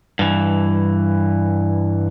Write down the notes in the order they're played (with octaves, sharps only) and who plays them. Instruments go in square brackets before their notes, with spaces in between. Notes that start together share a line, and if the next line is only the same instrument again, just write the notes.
[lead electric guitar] G2 E3